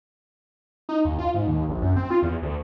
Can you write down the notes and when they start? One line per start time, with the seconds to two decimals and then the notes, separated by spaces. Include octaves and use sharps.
0.89 D#4
1.05 D#2
1.19 F4
1.34 G#2
1.47 D#2
1.69 A#1
1.82 F#2
1.96 C4
2.10 F4
2.22 E2
2.42 D2